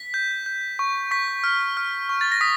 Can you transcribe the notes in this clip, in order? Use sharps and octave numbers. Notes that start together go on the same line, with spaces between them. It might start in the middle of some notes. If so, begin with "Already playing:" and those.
Already playing: B6
G6
G6
C#6
C#6 B6
F6
F6
C#6
A6
A#6
D#6 B6